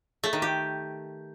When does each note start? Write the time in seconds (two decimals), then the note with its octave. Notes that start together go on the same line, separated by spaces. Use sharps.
0.24 A3
0.33 D#3
0.42 G4